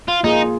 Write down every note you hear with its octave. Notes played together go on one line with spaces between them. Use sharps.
F4
A#3 D#4 F4 G#4